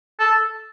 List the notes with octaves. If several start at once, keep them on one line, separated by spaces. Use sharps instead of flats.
A4